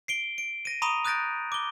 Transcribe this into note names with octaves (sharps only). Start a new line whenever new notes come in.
C7 D7 G7
D7
A#6 D#7
A#5 B5 C#6 D#6 D#7 F7
D#6 F#6 G6 A6 A#6 D7
D6 G7